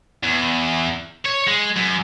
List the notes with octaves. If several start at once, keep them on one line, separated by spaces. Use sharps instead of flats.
E2
C#5
G#3
F#2